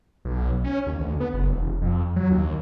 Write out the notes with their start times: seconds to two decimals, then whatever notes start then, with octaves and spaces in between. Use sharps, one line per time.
0.25 B1
0.64 C#4
0.86 D#2
1.00 D2
1.20 B3
1.34 F#1
1.49 E1
1.82 F2
2.16 F#3
2.31 D#2